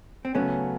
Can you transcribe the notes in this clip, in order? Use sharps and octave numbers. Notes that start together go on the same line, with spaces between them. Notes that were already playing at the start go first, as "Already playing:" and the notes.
C4
C#3 F#3 A3 B3 C#4